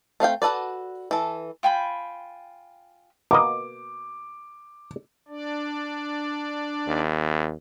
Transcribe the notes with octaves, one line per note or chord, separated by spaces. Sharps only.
A3 C4 F5 G5
F#4 A4 B4 D5
E3 A4
F4 G5 G#5 B5
B2 A#3 D#5 D6
D4 D5
D#2